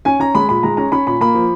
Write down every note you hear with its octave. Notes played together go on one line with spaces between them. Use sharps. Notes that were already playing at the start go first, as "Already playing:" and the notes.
C#4 G#5
C#4 A#5
G#3 B5
A#2 B5
G#3 A#5
C#4 A#5
C#4 B5
A#2 B5
A#3 B5
F3